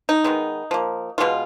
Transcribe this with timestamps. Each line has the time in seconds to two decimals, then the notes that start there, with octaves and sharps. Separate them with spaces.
0.09 D#4
0.24 D#3 G#3 B3
0.71 F3 A#3
1.18 B2 G#3 B3 F4